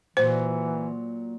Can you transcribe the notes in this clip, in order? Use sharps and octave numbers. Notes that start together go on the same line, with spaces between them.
A#2 E3 F#3 C5